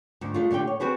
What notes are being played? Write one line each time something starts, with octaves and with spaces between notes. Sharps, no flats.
D2 G#2
G#3 A3 F4
A#2 D3 G4 G5
C#5
C4 F#4 G#4 B4